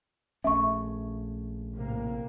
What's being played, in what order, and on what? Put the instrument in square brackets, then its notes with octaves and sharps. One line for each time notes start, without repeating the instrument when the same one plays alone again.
[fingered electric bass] A#1 A3 C#4 [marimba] E5 C#6
[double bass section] A2 C3 A#3